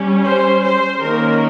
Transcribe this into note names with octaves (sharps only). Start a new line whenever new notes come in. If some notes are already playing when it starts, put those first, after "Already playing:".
Already playing: G3 C#4
C5
C5
D#3 A#3 C#4 A#4